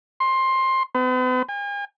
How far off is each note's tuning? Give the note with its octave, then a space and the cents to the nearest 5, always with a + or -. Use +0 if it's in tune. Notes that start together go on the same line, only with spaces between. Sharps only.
C6 +15
B3 +45
G#5 -45